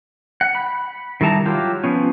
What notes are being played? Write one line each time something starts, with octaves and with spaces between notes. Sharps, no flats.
F#5
B5
D#3 G3 E4 A5 A#5
F#3 F4 G4
F3 B3 C#4